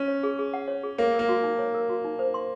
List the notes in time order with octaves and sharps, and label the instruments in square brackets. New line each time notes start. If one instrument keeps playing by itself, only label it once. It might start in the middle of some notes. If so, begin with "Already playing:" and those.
Already playing: [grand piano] C#4
[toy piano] C#5
G#4
G#4
F#5
C#5
G#4
[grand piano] A#3 [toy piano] C#5
[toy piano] A#4
[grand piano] A#3
[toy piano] F#4
D#4
C#5
A#4
F#4
D#4
C5
C6